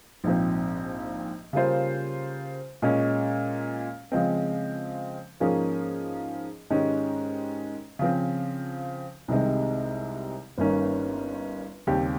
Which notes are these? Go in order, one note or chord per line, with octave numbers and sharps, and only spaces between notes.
A#1 G#2 F3 C4
C#3 G3 A#3 F4 C5
A#2 G#3 C#4
C#3 F3 G#3 C4
G#2 F3 A#3 C#4 G#4
G#2 D#3 G#3 C#4 G4
C#3 F3 C4
C2 C3 D#3 G#3 C4
G1 G2 D#3 A#3 C#4
D#2 C#3 G3 C4 G4